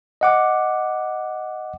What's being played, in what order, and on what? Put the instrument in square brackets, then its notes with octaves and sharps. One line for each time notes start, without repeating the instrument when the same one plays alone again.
[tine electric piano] D#5 F#5 D6